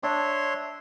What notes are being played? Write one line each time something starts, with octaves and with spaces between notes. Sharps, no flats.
D4 C#5 E5 C6